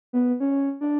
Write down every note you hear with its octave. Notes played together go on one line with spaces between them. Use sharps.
B3
C#4
D4